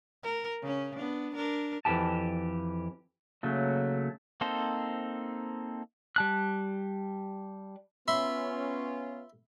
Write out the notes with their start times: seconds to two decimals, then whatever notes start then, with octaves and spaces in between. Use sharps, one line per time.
0.23 A#4
0.62 C#3 C#4
0.96 B3 D4
1.36 D4 A#4
1.85 F2 E3 G4 A5
3.43 C#3 F#3 A3 A#3
4.41 A#3 C4 D#4 A4 C5
6.16 G3 A5 F#6
8.08 B3 C#4 F4 E5 B5 C6